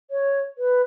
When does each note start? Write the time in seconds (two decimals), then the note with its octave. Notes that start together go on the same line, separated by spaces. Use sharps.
0.11 C#5
0.58 B4